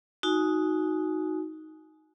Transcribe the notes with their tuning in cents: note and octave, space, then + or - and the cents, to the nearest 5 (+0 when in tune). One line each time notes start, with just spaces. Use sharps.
D#4 +10 F#4 -10 G#5 +25